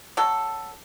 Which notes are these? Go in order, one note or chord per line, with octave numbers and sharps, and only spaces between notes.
F#3 A4